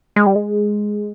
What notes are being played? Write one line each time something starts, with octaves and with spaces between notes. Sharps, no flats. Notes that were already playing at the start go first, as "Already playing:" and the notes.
G#3
G3
G#3